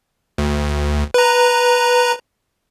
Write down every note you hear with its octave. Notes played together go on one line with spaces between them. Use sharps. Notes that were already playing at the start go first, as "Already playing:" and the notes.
D2
B4 A#5